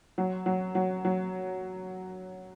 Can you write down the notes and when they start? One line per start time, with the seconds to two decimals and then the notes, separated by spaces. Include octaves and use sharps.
0.18 F#3
0.46 F#3
0.75 F#3
1.05 F#3